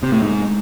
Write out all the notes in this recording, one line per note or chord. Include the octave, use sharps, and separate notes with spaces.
C3
A2
G#2